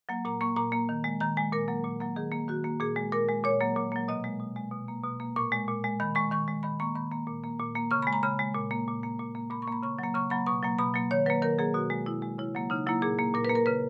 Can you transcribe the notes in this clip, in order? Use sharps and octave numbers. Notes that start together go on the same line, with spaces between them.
F#3 A#3
A#2 A#5
A#3 C#6
A#2 A#5
A#3
D#3
G#3
D#3 A#5
G#3 G#5
A#2 A#4
F#3 A#3
A#2
F#3 A#3
D#3 G#4
A#3
D#3 F#4
A#3
A#2 G#4
G#3
A#2 A#4
G#3
A#2 C#5
F#3 A#3
A#2
F#3 A#3
B2 D#5
G#3
B2
G#3
B2
A#3
B2
A#3
A#2 C#6
G#3
A#2
G#3
D#3 B5
G#3 C#6
D#3 C#6
G#3
D#3 B5
A#3 C#6
D#3 B5
A#3
A#2
A#3
A#2
A#3
C#3 C#6
B5
G#3
A#5
C#3 B5
G#3
A#2
A#3
A#2
A#3
A#2
A#3
A#2 B5
C#6
A#3 B5
C#3 C#6
F#3
A#3
C#3 C#6
F#3 A#3 B5
B2 C#6
F#3 A#3
B2 B5
F#3 A#3
D#3 C#5
F#3 A#3 B4
D#3 A#4
F#3 A#3 G#4
B2 F#4
G#3
B2 E4
G#3
C#3 E4
F#3 A#3
C#3 D#4
F#3 A#3 E4
A#2 G#4
A#3
A#2 A#4
B4
A#3
A#4
C#3 B4